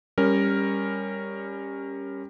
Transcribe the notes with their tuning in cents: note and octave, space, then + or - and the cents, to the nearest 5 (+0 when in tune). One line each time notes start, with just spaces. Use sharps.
G3 +15 C#4 -5 A#4 +0